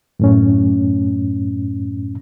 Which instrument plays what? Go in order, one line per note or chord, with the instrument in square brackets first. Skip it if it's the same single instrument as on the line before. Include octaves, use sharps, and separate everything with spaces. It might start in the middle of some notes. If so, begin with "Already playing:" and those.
[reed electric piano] F#2 A2 C#4